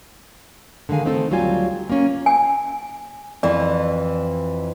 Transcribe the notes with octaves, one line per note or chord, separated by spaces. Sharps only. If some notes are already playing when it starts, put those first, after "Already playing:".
D3 D#3 G#3 F5 G#5
E3 A3 C4 D#4 G4 A4
D2 F#3 G3 F4 G#4 G#5
A#3 C#4
G#5
F2 E3 D5